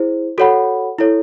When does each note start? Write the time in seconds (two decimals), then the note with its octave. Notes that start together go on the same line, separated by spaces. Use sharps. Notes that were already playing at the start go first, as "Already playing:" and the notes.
Already playing: E4 G#4 C5
0.38 F#4 A4 C#5 F#5 B5
0.99 E4 A4 C#5